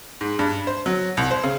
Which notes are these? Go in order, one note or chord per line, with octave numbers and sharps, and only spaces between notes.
G#2
G2
C5
F#3
C2
C5
C#3